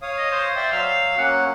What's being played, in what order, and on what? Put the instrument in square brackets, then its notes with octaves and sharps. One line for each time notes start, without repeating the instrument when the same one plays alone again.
[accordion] C#5 F5 D#6
[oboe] D#5
C5
[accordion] D5 E5 G5
[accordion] F#3 E6 [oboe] F5
[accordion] F#3 A#3 C#4 [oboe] F#5